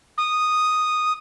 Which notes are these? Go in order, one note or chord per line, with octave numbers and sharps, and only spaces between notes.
D#6